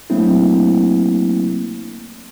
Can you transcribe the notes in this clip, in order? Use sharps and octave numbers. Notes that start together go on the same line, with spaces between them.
F#3 A3 A#3 C4 D4 E4